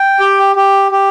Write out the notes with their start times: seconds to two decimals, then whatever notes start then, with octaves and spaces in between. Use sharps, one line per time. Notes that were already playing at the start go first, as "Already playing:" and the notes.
Already playing: G5
0.20 G4
0.56 G4
0.92 G4